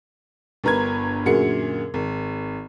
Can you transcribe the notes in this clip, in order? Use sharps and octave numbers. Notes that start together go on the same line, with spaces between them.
G1 G2 A#4 B4 G#6
F#2 A#2 D3 F#4 G#4 C#7
G#1